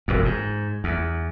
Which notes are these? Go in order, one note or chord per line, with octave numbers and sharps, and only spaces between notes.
E1 F2
G#2
E2